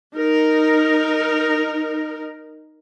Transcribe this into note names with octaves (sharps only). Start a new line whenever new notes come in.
D#4 A#4